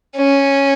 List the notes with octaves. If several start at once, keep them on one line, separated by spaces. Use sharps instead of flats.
C#4